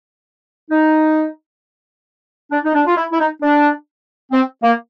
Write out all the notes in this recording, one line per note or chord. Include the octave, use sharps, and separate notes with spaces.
D#4
D4
D#4
D4
F4
E4
E4
D#4
D4
C4
A#3